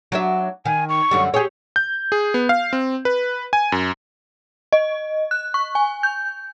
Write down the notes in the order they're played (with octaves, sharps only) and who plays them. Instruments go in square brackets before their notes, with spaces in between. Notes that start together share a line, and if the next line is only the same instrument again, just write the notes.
[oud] F#3 D4 E5
[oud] D#3 [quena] G#5
[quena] C#6
[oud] F#2 D3 G3
[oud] G4 C#5 [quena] G#4
[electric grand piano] G6
G#4
B3
F5
C4
B4
G#5
F#2
[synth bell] D#5
F#6
C#6
G#5
G6